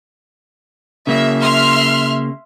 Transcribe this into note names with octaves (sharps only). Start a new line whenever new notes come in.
C#3 A#3 E5
E5 C6 F6